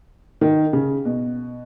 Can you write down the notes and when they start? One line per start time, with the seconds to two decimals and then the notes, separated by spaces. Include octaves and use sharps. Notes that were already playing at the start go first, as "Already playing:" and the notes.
0.41 D#3
0.73 C#3
1.05 B2